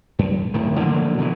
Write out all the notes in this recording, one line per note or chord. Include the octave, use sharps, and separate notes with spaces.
F#2
D1 A2 D#3
D3 F3 F#3 A#3
B2 D#3 E3